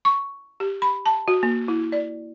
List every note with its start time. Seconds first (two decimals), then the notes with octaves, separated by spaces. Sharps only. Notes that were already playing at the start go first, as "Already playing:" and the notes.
0.05 C#6
0.60 G4
0.82 B5
1.06 A5
1.28 F#4
1.43 A#3
1.68 E4
1.92 D5